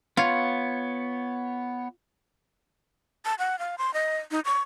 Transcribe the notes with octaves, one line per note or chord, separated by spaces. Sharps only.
B3 F4 C#5
A5
F#5
F5
C6
D#5
D#4
C#6